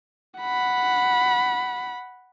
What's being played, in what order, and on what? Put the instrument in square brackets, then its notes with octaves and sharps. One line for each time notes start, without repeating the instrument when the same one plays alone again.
[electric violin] F#5 B5